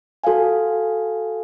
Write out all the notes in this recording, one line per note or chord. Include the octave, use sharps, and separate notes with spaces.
F#4 A4 F5 G#5